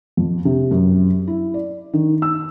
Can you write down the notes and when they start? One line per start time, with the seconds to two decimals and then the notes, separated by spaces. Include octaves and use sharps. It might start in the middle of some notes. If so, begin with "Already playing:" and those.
0.17 F2
0.45 C3
0.71 F#2
1.28 E4
1.54 D5
1.93 D#3
2.22 E6